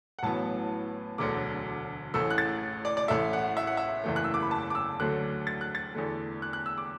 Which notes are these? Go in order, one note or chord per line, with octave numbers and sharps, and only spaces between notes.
F#5
A1 A2 F#3 B3 A5
E1 D2 D3 F#3 D6
A1 A2 A3 E6
F#6
A6
D5
D5
A1 A2 A3 E5
F#5
E5
F#5
E5
F#1 E2 E3 A3
F#6
E6
D6
B5
A5
D6
E6
D2 D3 F#3 A3 F#6
A6
F#6
A6
E2 D3 A3
F#6
F#6
E6
D6